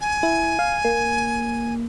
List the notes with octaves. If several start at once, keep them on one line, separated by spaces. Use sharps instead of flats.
G#5
E4
F5
A#3